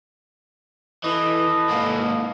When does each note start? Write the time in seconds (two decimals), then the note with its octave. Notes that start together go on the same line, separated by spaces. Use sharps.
1.04 E3 A4 B4 D#5
1.69 G#2 A#3